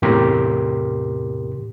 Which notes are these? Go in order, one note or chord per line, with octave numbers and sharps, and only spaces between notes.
E2 A2 C3 G4 A#4 C6